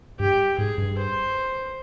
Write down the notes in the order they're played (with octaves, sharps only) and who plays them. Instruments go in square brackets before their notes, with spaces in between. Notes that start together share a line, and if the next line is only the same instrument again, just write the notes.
[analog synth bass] G2 [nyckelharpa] G4
[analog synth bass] G#2 [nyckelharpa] G#4
[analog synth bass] G2
[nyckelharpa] C5